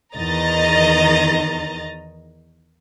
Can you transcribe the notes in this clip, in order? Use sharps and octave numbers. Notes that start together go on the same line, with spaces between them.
E2 D#3 D#5 A#5 A6